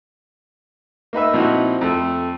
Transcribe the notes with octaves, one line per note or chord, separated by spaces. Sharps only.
A#3 D#4 B4 E5
A#2 F3 C4 D#4 E4 F#4
F2 A3